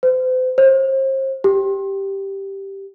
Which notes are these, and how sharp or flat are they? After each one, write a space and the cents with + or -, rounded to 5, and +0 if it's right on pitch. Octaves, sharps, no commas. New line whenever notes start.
C5 -40
C5 +35
G4 +0